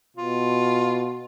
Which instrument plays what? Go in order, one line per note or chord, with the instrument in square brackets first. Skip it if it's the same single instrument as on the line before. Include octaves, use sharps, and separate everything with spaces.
[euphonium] B2 [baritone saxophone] F4